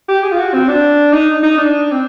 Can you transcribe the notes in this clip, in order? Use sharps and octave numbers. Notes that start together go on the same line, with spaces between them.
G4
G#4
F4
F#4
C4
D4
D#4
D#4
D4
C4